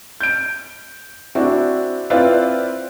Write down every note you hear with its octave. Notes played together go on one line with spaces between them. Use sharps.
G6 D7
C4 D4 E4 F#4
C4 E4 F4 B4 D5 F5